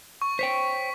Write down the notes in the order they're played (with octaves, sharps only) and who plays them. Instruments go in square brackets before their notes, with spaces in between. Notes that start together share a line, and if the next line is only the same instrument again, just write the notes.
[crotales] C#6
[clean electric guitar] C5 C#5 G5 [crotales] B6